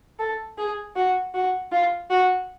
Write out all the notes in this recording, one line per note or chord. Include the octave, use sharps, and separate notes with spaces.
A4
G#4
F#4
F#4
F4
F#4